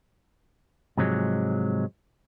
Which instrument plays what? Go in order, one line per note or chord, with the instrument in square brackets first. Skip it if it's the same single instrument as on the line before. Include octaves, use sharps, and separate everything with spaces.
[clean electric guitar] G#2 C3 F3 F#3 G#3